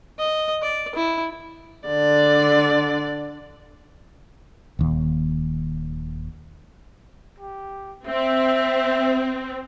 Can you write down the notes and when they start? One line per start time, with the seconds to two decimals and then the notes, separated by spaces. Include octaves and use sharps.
0.19 D#5
0.62 D5
0.95 E4
1.87 D3 D5
4.79 D#1 D#2
7.38 G4
8.07 C4 E5